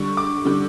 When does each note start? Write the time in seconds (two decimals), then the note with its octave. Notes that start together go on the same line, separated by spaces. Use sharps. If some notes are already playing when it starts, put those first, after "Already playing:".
Already playing: D3 G3 C#6
0.17 D6
0.45 D3 G3